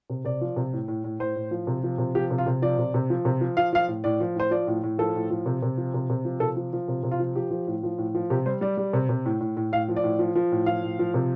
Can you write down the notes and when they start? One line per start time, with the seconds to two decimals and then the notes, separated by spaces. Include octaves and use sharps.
0.10 C3
0.25 C3 D5
0.41 F3
0.56 C3
0.73 A2
0.88 A2
1.04 A2
1.19 A2 C5
1.36 A2
1.51 F3
1.67 C3
1.83 F3
1.98 C3
2.15 F3 G4
2.31 C3
2.38 F4
2.47 C3
2.62 F3 D5
2.78 C3
2.94 C3
3.10 F3
3.25 C3
3.41 F3
3.57 F3 F5
3.73 F3 F5
3.88 A2
4.04 A2 D5
4.20 F3
4.35 A2 C5
4.51 F3 D5
4.67 A2
4.83 A2
4.98 F3 A4
5.15 A2
5.30 F3
5.46 C3
5.63 C3
5.77 F3
5.94 C3
6.10 C3
6.25 F3
6.40 C3 A4
6.56 F3
6.73 F3
6.88 C3
7.03 C3
7.11 F4
7.19 F3
7.35 F3 G4
7.51 F3
7.67 A2
7.83 F3
7.98 A2
8.15 F3
8.30 C3 G4
8.46 G3 C5
8.61 G3 D5
8.77 G3
8.93 C3
9.09 C3
9.25 A2
9.40 A2
9.57 A2
9.72 A2 F5
9.88 F3
9.96 D5
10.04 A2
10.19 F3
10.35 F3
10.52 A2
10.66 F3 F5
10.83 A2
10.99 F3
11.14 C3